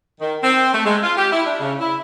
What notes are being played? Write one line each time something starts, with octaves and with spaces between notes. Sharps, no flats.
D#3
C4
A3
G#3
F4
G4
E4
D4
C#3
E4